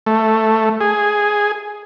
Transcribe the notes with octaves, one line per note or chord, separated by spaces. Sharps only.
A3
G#4